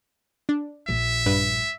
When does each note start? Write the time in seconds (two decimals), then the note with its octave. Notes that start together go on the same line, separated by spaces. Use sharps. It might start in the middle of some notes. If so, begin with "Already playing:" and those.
0.49 D4
0.89 A#1 E5
1.26 G2 B4